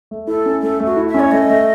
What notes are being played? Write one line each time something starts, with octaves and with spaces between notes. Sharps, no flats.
A3
E4 A4
C#4
A3 A4
A3
F#4
E4
E5
C#4
C#5
A3 D#5
A3